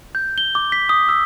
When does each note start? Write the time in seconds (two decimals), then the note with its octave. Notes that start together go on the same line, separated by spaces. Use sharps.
0.15 G6
0.38 G7
0.55 D6
0.72 B6
0.89 D#6
1.09 E6